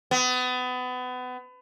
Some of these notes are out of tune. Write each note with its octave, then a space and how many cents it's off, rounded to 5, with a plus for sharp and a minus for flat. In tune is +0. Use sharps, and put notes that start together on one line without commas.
B3 +30